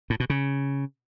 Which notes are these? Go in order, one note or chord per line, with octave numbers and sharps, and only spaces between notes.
A2
B2
C#3